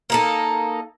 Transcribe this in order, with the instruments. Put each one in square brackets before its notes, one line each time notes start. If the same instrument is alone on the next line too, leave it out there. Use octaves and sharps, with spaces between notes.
[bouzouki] A#3 D#4 A4